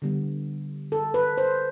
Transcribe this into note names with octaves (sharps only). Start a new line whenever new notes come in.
D3 G3 B3
A4
B4
C5